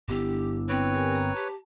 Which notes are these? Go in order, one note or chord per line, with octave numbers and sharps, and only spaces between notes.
G1 B3 D4 E4 G4
C4 B4 C#5
G4 A#4 G#5
A#5
G4 A5